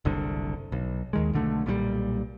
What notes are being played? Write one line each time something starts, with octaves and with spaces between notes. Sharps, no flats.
F#1 C2 D3
B1
D#2 D#3 G#3
B1 D3 A3
B1 A#2 D3 G3